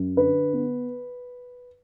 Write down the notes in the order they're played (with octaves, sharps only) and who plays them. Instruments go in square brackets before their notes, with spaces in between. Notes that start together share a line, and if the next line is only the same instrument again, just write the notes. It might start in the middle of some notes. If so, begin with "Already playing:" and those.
Already playing: [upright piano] F#2
D3 B4
B3